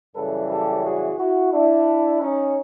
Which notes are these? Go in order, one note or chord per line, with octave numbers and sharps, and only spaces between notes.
F#2 C#3 E3 G3 A4 B4
G4 A4
F#4 G#4
E4 F#4
D4 E4
C#4 D#4